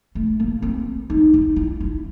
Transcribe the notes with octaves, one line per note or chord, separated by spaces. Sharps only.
A3
A#3
C4
D#4
D#4
E4
E4